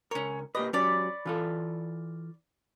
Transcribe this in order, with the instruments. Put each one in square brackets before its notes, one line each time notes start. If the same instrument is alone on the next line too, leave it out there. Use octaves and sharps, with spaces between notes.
[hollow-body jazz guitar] C#2 A#4 [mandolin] C#4 C#5
[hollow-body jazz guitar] A#3 G4 B4 [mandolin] D#5
[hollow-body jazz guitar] F#3 C#4 G4 [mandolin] C#5 D5 B5
[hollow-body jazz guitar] E3 F4 A4